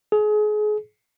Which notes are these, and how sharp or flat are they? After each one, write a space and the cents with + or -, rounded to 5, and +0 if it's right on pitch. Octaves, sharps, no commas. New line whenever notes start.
G#4 +30